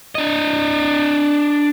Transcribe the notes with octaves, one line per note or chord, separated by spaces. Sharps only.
D4 D#5